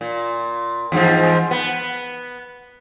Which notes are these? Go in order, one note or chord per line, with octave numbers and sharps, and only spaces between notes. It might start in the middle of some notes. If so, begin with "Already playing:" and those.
A#2
E2 G#2 F3
B3